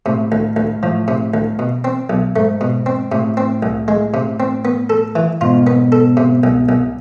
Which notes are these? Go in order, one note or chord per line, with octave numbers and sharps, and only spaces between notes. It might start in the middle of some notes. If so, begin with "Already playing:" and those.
A2 C3
D2
D2
A2 F3
C3
D2
B2
C4
B1
G#2 A3
B2
C4
A2 C3
C4
C2
G#3
C3
C4
B3
A4
E3
G#2 B2 F4
B3
A4
C3
C2
C2